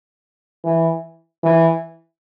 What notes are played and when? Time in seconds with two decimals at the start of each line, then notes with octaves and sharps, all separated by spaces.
0.64 E3
1.43 E3